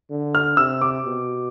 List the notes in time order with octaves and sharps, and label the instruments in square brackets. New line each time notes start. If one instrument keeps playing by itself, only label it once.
[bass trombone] D3
[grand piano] F6
[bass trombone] C3 [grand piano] E6
[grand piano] D6
[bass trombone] B2